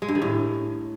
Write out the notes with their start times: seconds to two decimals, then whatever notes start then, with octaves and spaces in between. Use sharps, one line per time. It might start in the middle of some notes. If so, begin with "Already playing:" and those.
0.02 G#3
0.08 G2
0.15 D#3
0.22 A2